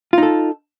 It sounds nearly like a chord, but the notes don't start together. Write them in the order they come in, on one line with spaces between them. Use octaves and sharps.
F4 D#4 A4